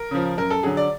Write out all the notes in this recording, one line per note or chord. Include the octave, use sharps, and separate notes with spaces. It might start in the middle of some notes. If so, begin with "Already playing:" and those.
Already playing: A#4
C#3 F3
F#2 A#4
A4
D3 F#3 G#4
D5